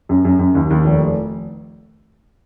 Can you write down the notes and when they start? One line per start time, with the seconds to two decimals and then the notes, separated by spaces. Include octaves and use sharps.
0.09 F#2
0.25 F#2
0.39 F#2
0.55 D#2
0.70 D#2
0.85 F1
1.01 F1